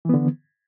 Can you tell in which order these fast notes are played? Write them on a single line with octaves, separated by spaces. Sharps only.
E3 B3 D3